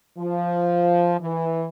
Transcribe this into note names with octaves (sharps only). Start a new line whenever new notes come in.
F3
E3